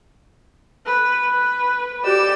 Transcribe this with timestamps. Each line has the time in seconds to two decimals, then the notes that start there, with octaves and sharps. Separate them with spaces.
0.86 B4
1.31 B4
2.03 G4 D5 E6